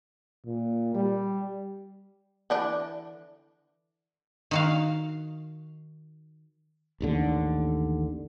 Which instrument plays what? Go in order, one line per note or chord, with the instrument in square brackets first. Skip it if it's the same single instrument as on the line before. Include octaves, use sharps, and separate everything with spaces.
[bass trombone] A#2
G3
[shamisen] D3 E3 D4
[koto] D#3 F#4 F5
[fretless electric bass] A1 D#2 D3